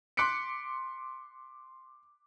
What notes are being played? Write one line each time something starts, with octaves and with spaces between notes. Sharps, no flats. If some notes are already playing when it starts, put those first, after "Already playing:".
C6 D6 F#6 B6 C#7 D7